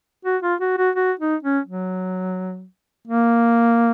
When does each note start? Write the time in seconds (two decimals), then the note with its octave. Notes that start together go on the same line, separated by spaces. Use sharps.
0.25 F#4
0.42 F4
0.61 F#4
0.78 F#4
0.95 F#4
1.19 D#4
1.43 C#4
1.66 F#3
3.07 A#3